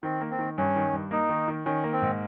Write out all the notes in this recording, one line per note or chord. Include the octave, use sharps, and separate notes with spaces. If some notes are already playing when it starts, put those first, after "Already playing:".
D#3 C4
A#3
C4
D#3
G2 C#4
D#3
G2
A#3 D#4
D#3
D#3
D#3 C#4
A#3
C4
G#2